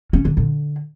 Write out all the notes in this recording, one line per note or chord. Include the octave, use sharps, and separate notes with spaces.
C#4
D3
D3